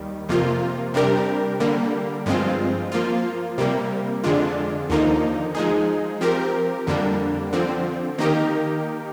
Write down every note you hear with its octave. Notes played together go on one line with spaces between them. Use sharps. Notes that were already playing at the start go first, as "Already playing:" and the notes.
Already playing: D#2 D#3 G3
F2 C3 F3 A#3 F4
C3 G3 D4 G4 A#4
D3 G3 A#3
G2 F3 G#3 C4 F4
F3 A#3 F4
C3 G3 A#3
F2 D3 G#3 D4 F4
D#2 D3 F3 A#3 D#4
F3 G#3 D#4 G#4
F3 C4 G4 A#4
F2 D3 G3 A#3 D4
D3 F3 C4
D#3 A#3 D#4 G4 A#4